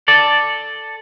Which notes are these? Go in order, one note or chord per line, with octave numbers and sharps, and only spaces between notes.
A4 D5